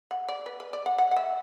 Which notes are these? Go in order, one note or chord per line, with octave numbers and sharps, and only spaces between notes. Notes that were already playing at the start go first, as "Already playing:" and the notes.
F#5
D5
B4
B4
D5
F#5
F#5
F#5
E5